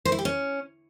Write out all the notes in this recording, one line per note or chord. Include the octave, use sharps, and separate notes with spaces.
C5
E4
G4
C#4